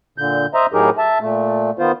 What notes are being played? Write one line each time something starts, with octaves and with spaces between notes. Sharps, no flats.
A#2 D3 G6
C5 D#5 E5 A#5
A2 F#3 D#4 G4 G#4 A#4
E5 A5
A#2 A3
D#3 B3 F4 C5